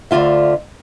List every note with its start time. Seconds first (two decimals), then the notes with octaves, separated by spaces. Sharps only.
0.11 D2 G2 D3 F4 E5